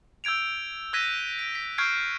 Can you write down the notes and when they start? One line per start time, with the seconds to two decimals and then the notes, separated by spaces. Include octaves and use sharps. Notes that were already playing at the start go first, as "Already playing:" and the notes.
0.24 E6 G6 G#6 D7 F7
0.93 E6 F#6 G#6 A#6 B6 D#7
1.39 D7
1.55 B6
1.78 C#6 F6 G6 G#6 C7 D7